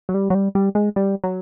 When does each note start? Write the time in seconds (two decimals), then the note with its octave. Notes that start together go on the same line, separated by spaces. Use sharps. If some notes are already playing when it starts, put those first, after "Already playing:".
0.09 F#3
0.14 G3
0.30 F#3
0.34 G3
0.55 G3
0.75 G#3
0.96 G3
1.24 F#3